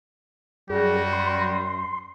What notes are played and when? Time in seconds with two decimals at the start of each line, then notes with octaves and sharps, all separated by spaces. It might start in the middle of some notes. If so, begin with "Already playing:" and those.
0.70 F#2 G3 F#4 G#4
1.13 C6